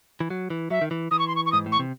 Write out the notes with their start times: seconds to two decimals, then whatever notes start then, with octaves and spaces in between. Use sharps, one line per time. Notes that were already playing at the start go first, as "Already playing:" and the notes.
0.20 E3
0.30 F#3
0.50 E3
0.70 F#3 E5
0.81 D#3
0.91 E3
1.11 E3 D#6
1.19 C#6
1.28 C6
1.36 C#6
1.46 C#6
1.52 G#2 D#6
1.66 A2
1.72 C#6
1.79 C3